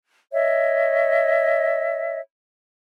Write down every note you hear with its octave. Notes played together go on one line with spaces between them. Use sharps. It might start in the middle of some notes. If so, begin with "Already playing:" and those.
C#5 D#5 E5